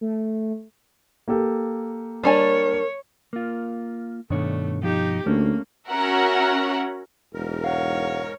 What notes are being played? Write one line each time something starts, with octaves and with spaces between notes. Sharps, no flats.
A3
A#3 G4 A4
G3 D4 A#4 C#5 G#5
A#3 F4
G2 B2 D#3 A3 D4 C#5
F3 D#4 G4
D2 A3 A#3 C#4
C#4 F#4 A#4 E5 F#5
E1 G#2 A#4
C#5 F5 F#5